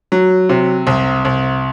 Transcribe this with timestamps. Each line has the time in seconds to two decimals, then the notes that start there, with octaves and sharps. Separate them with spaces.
0.12 F#3
0.49 C3
0.87 C2
1.25 C2